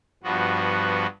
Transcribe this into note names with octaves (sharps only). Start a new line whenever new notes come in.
G2 F3 B3 F#4